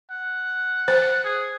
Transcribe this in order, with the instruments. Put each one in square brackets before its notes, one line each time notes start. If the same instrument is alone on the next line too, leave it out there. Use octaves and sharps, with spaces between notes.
[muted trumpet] F#5
[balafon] C5
[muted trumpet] G#4